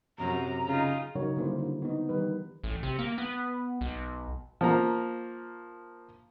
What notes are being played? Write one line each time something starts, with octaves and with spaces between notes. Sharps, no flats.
F#2 C3 A#5
C#3 D#4 F4
C#3 F#3 C#4 D#4 A#4 C#5
D3 G3 A#3 E4 C5
D3
B3 D#4
D#3 E3 G3 B4
A1
C3
A#3
B3
B1
F3 A#3 A#5